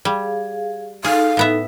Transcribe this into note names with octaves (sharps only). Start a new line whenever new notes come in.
G3 G#4 F5
D#4 G#4 A4 F5
A2 B3 E5